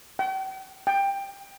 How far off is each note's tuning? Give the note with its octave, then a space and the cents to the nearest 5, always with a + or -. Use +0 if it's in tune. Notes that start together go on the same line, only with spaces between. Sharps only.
G5 -45
G5 +15